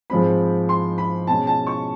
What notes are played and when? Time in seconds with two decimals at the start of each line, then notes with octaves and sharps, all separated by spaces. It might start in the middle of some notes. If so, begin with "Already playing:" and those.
0.10 G#2 F3 G#3 C4 B5
0.69 C6
0.98 B5
1.27 B2 G#3 C#4 A5
1.47 A5
1.67 C#6